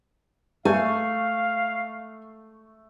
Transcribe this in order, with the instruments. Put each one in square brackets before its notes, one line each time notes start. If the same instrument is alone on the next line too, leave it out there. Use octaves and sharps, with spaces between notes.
[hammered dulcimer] A3 [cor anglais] F5 [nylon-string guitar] G#5